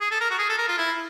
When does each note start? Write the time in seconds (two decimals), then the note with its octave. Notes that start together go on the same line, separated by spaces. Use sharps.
0.01 G#4
0.11 A4
0.21 A#4
0.31 F#4
0.39 G#4
0.50 A4
0.58 A#4
0.68 F4
0.78 E4